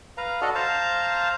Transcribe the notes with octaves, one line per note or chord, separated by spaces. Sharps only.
B4 F5 A#5
D4 F#4 A4 D#5
C5 F5 A5 A#5